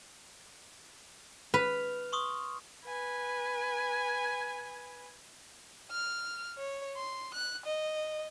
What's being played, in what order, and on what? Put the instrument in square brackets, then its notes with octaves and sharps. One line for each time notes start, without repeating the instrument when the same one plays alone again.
[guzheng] B4 [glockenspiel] F6 F7
[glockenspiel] C6 C#6 D#6
[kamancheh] B4 G#5
[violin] F6
C#5
C6
F#6
D#5